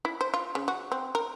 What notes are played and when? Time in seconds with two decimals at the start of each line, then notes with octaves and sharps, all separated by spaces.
0.05 E4
0.21 C5
0.34 F4
0.55 C#3
0.68 F#4
0.92 C4
1.15 A#4